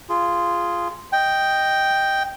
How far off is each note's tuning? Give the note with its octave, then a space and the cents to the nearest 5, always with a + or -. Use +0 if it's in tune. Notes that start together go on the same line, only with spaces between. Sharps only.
F4 -10 G#4 +0
D#5 +0 G5 +0